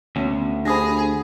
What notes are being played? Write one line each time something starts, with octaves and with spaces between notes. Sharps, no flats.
D2 B3 C#4
D4 G4 G#4 C5 B5 D#6 A#6